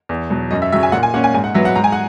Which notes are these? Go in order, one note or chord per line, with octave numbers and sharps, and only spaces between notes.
E2
B2 F#3
F#2 D#5
E5
C#3 F#3 C#4 E5
G#5
A#2 F#5
G#5
A#3 C#4 F#5
G#5
G#2 G#5
F#5
F#3 B3 E5
F#5
G#2 A#5
G#5
F#5